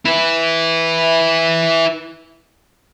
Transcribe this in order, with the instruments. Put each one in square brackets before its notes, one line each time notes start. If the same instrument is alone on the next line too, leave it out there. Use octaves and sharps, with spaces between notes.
[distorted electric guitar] E4 B4